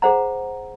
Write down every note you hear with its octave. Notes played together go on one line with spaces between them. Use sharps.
G#4 C5 F#5 A#5